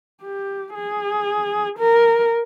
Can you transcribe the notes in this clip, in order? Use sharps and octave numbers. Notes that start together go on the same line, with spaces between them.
G4
G#4
A#4